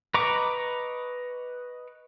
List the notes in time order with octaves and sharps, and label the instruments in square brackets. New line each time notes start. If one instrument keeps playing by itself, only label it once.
[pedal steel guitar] B4 D#5 A#5 C#6 D6